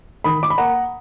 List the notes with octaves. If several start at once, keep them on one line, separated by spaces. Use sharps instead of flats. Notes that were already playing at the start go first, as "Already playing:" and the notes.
D#3 B5 D#6
D6
B5
A#3 F#5 A#5